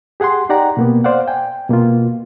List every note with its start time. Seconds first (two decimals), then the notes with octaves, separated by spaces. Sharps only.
0.20 G4 G#4 F#5 G#5 C6
0.49 D#4 G4 D5 F#5 G5 A#5
0.77 B2 A#3 B3
1.04 C5 D5 F5 F#5
1.28 G5 G#5
1.69 B2 A#3 B3 F4